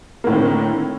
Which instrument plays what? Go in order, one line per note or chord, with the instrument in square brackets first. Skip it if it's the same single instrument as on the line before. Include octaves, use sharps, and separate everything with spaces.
[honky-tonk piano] A#3
A2
D#3
C4
D3